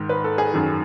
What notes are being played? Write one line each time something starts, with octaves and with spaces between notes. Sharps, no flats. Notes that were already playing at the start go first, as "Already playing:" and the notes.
Already playing: G#2 D#3
B4
A4
G#4
F#2 D#3